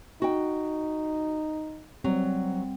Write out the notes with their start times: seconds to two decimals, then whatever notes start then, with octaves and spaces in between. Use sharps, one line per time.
0.22 D#4 F#4 G5
2.04 F#3 G3 C4